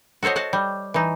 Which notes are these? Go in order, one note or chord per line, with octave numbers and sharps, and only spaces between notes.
F#4 A4 C5 C#5 D#5
F#4 D#5 F#5 A5
G3
E3 D#4